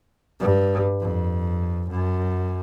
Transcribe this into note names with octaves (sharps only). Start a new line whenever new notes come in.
G2
F2
F#2